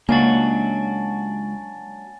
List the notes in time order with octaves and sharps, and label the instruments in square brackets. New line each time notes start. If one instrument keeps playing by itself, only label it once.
[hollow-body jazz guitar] C#2 [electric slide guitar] F#3 D4 F#4 [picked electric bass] A#3 [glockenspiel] G#5 A6